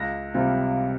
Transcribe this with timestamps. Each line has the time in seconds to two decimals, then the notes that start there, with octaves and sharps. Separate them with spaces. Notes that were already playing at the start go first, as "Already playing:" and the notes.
Already playing: C#2 A#6
0.34 C3 G3 C4 F4